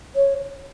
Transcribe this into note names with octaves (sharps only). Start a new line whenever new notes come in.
C#5